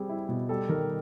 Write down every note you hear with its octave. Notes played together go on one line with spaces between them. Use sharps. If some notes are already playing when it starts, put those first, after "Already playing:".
Already playing: G3 C4 G#4
E4
B2
G3 A4
D#3 A#4